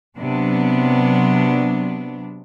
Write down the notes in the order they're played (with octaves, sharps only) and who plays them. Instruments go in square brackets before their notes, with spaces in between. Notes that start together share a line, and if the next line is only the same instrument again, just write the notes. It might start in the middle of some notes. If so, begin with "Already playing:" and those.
[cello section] C3 F#3 B3 D4